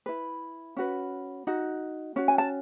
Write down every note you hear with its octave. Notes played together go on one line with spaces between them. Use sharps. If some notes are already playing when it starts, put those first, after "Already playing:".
E4 B4
C#4 F#4 B4
D#4 F#4
C#4 F#4
G#5
A5